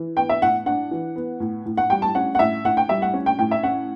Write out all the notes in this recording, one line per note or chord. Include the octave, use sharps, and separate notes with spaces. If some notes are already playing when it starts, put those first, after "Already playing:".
Already playing: E3
B3 G5
E5
A2 F#5
D4 F#5
E3
B3
A2
A2
F#5
G3 G5
A5
C#4 F#5
F#5
A2 E5
A2 F#5
G5
G3 E5
F#5
C#4
G5
A2 G5
E5
C#4 F#5